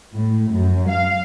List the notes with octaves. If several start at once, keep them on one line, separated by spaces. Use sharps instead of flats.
A2
F#2
F5